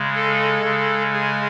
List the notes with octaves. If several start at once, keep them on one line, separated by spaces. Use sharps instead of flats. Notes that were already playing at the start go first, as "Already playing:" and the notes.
Already playing: C#3 G#3
A4
C#3 G#3
G#4